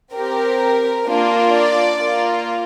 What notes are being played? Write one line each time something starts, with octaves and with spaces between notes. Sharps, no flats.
C4 G4 A#4
A#3 D4 F4
D5
A#3 F4